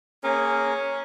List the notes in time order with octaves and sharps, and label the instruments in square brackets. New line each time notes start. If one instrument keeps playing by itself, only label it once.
[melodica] A#3 G#4 A#4 [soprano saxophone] C#4